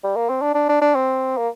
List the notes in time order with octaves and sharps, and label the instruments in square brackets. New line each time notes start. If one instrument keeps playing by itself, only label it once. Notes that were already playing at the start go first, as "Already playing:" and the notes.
[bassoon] G3
A#3
C4
D4
D4
D4
D4
C4
A#3